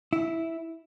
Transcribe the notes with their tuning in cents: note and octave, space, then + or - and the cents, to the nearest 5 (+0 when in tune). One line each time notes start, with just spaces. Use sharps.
E4 -5